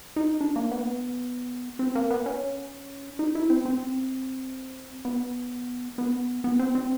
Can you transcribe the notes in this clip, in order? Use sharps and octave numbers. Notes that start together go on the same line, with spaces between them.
D#4
D4
A#3
B3
C4
A#3
B3
C#4
D#4
E4
C4
C4
B3
B3
B3
C4
C4